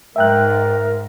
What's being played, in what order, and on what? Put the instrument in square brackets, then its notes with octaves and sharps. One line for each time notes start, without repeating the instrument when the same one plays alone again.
[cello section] G#2 [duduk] A#4 [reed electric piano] E5 G5 F#6